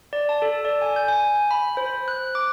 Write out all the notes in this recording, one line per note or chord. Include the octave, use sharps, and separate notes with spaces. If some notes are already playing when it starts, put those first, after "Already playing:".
D5
A5
A4
D5
G#5
G6
G#5
B5
C5
F#6
D6